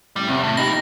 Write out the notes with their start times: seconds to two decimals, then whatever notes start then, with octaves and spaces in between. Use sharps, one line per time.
0.16 A2 G3 C#4
0.28 E2 C3 C4
0.43 A2
0.57 D2 A#2 E3 D#4 G4 A#6